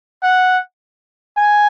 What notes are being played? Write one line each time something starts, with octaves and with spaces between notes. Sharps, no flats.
F#5
G#5